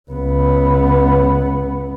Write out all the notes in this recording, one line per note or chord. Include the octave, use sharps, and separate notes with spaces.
C#2 B3